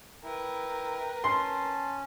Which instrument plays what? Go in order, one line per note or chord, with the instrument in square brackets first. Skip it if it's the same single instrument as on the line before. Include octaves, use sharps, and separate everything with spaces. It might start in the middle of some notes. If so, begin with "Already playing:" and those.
[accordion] E4 [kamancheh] A#4 B4 [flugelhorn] G5
[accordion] C#4 [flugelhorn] A5 [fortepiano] C6